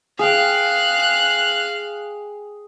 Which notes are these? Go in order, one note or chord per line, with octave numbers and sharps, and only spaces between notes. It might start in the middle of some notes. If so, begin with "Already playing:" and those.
G#4 F5 G5 F#6